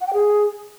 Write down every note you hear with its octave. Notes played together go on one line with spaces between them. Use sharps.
F#5
G5
G#4